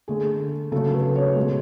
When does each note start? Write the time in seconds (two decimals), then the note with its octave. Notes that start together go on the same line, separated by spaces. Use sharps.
0.08 D3 A3 G#4
0.72 C#3 F#3 A3 A4
0.94 B4
1.16 C#5
1.36 B2 G#3